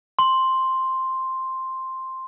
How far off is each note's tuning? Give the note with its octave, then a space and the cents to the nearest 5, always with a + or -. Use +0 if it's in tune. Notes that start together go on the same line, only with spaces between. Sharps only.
C6 +5